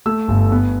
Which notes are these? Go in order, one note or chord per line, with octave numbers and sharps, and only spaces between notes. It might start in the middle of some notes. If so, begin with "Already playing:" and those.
A3 E6
G1
B3